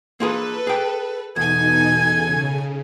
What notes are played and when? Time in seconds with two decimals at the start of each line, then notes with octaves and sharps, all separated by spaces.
0.20 A#3 F4 G#4 A4 B4
0.67 G#4 G5
1.36 E2 B2 D#4 A4 G#5 G#6
2.05 C#3